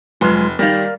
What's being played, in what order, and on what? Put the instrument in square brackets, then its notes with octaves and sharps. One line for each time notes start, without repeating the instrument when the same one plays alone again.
[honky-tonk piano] F1 B4 [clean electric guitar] F#3 G#3 F4
[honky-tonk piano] D#3 G3 [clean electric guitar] A#4 D5 F5